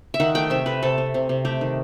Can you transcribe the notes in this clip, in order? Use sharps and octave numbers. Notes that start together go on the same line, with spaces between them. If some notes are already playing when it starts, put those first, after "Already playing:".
E5
D#3 F#5
A3 G5
C3 E5
A3 B4
C3 A4
C3
C3
C3
A3 G4
D#3